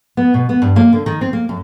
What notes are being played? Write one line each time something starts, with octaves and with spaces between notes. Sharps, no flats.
B3
B2
B3
G2
A#3
D3
D#3
C4
A#3
F#2